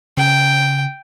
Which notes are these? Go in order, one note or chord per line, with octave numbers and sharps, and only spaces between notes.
C#3 G5